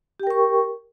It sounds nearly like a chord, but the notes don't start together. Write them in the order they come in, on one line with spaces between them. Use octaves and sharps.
G4 G5 A#4 C#6